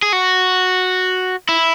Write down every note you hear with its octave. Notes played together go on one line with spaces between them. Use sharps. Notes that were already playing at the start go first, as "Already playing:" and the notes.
G#4
F#4
E4